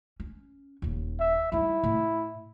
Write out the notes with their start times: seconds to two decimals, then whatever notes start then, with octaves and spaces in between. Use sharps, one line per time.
0.20 C#4
0.82 D#1 D#2
1.20 E5
1.52 G3 D#4 E4
1.84 A2